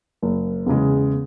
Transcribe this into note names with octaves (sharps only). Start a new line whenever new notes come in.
F#1
E2 C#3 G#3